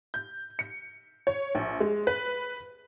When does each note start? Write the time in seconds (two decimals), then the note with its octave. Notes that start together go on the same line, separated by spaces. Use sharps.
0.14 G6
0.59 C#7
1.27 C#5
1.55 A#1
1.80 G#3
2.07 B4